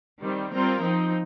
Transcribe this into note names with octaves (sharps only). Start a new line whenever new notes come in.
D#3 G3 C4
G3 C4 F4 A#4
F3 C4 D#4